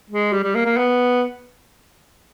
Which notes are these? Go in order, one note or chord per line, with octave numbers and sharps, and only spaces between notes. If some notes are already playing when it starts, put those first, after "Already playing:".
G#3
G3
G3
A#3
A#3
B3